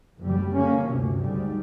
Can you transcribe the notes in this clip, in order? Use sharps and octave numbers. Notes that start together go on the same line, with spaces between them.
F#1 D2 G3
D3 A#3 C#4
G1 D2 C3
D2 G#2 G3